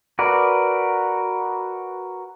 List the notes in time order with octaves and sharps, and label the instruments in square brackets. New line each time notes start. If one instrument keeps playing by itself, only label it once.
[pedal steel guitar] F#4 A#4 B4 D5